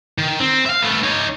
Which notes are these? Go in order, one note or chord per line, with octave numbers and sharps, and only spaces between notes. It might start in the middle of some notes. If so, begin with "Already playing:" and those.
D#3
C4
E5 F5
A3 B3
D#4 C#5